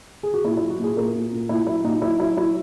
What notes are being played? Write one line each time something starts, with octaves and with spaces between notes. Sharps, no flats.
G#4
F#4
A#2 E4
E4
F#3
F#4
A#2 G#4
A#2 A#4
A#2
A#2
A#2 E4
F#3 E4
A#2 D#4
F#3 E4
F#3 E4
F#3 E4